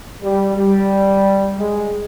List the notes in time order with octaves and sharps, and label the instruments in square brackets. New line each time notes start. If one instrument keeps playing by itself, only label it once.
[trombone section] G3
G3
G#3